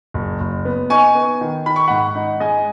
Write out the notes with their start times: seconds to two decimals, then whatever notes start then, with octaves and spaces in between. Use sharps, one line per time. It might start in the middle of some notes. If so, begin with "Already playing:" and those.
0.14 F#1
0.40 F#1
0.65 B3
0.90 D#4 G#5 C#6
1.15 B3
1.41 D#3
1.66 D#3 B5
1.76 C#6
1.87 G#2 F#5 B5
2.15 D#4
2.40 G#3 D#5 G#5